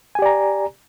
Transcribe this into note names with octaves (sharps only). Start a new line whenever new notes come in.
G4 D5 G#5 A#5